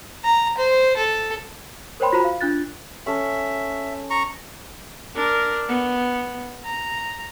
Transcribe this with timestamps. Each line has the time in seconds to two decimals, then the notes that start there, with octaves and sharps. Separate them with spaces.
0.25 A#5
0.58 C5
0.97 A4
2.00 A#4 C5 C#5 G5 B5 C6
2.13 F4 F#4 C5 A#5 B5
2.24 F5
2.41 D4 F4 F#6 A6
3.06 C#4 A4 E5
4.10 A#5 C#6
5.16 D4 A#4
5.68 B3
6.65 A#5